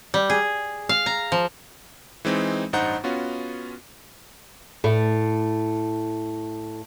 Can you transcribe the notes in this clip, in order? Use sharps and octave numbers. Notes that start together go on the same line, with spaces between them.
G3
G#4
F5
A#5
F3
E3 G#3 C4 D#4
A1 G2 D#4 C5 F#5 A#5
B3 C#4 F4 F#4
A2 A3